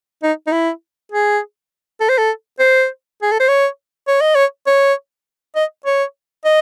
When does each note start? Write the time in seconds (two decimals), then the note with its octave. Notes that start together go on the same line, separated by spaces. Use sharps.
0.23 D#4
0.47 D#4
0.52 E4
1.12 G#4
2.00 A4
2.09 C5
2.18 A4
2.59 C5
3.22 G#4
3.32 A4
3.40 C5
3.48 C#5
4.08 C#5
4.21 D#5
4.35 C#5
4.67 C#5
5.55 D#5
5.86 C#5
6.45 D#5